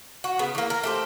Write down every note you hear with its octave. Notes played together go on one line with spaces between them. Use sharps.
F#4
C#3 B3
E3 A#3
A#4
A3 G4 C5